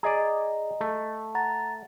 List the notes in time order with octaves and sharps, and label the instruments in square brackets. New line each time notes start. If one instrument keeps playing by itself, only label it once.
[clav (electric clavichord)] G#4 D5 [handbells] D#5 A#5
[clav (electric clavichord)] A3
[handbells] F#5 A#5 A6